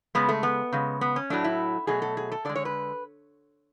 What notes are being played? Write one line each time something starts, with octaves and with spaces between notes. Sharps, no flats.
C#3 G#3 B3
A3
B3
C#3 G#3
B3
C#4
A2 F#3 A3 D4
E4
B2 F#3 A3 G#4
A4
G#4
A4
D3 G#3 D5
C#5
B4